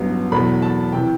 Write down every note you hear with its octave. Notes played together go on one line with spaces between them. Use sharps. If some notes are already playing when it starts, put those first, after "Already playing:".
Already playing: A1 G2 F#3 B3
E2 B2 F#3 A3 B5
A5
C3 E3 G5